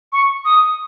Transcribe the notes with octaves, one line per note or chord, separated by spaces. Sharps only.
C#6
D#6